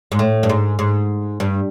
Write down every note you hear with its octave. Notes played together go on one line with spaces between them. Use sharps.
G#2
A2
G2
G#2
G#2
G2